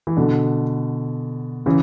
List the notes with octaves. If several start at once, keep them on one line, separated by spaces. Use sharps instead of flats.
E3
B2 D3
C#3 E3